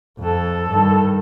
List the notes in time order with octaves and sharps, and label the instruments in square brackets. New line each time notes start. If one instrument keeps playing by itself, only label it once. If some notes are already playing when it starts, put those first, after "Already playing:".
[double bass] F2 [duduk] A4
[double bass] G2 D#3